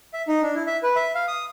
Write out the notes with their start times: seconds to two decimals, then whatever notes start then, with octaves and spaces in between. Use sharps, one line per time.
0.14 E5
0.28 D#4
0.42 D4
0.55 E4
0.67 E5
0.83 B4
0.96 E5
1.15 F5
1.28 D#6